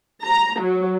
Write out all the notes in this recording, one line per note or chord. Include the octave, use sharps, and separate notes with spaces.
A#5
F#3